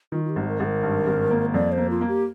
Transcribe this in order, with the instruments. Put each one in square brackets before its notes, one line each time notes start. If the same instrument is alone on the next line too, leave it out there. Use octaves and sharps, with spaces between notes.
[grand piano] D#3 [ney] F4
[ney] F4
G4
[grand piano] G#1
[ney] A#4
[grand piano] G#1 [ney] G#4
[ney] A#4
[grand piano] G2
G#1
A#3
[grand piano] F2 [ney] D5
[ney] C5
[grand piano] A#3
[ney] F4
[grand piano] A#3
[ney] G4